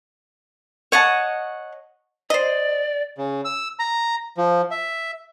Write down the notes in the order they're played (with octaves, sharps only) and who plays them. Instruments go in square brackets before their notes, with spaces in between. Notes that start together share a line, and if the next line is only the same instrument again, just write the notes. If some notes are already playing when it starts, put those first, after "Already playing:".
[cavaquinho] C#5 D#5 F#5 A5
[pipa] C5 D#5 [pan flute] D5
[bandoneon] C#3
E6
A#5
F3
E5